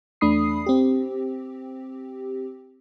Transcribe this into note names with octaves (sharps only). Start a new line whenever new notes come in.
E2 A3 D4 B5 D#6 C7
C4 G4